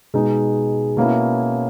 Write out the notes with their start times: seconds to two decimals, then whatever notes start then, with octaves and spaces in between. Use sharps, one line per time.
0.14 B2 G#3 D#4
0.97 B2 A#3 C#4 E4